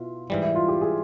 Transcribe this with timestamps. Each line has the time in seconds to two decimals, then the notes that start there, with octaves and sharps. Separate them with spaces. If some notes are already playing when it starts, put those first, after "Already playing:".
Already playing: B2 E4 F4
0.30 G#2 E3 G3
0.43 E4
0.55 F4
0.68 G4
0.81 G#4